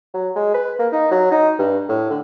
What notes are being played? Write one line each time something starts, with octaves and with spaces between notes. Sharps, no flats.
F#3
G#3
B4
A#3
D#4
F#3
D#4
G2
A2
D3